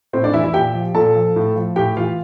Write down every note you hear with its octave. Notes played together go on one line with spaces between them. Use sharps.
A2 C4 C5
D4 D5
E3 E4 E5
E4 E5
A#2 G4 G5
F3
A#2 A4 A5
F3
A2
F3
A2 G4 G5
E3 F4 F5